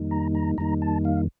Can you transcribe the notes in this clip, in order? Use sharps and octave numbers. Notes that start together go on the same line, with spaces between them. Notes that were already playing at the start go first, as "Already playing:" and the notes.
Already playing: F2 D#3 G3 A#3 D#4
A#5
A#5
F2 D#3 G3 A#3 D#4 A#5
A5
F5